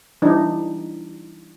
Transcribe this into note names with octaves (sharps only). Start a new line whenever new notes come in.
E3 G3 D4 D#4